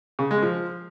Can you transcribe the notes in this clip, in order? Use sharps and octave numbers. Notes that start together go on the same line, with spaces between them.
C#3
G#3
F3